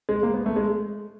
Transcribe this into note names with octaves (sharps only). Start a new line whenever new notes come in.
G#3
A#3
B3
A3
G#3